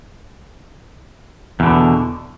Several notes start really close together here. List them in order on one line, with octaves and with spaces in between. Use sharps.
E2 B2 D3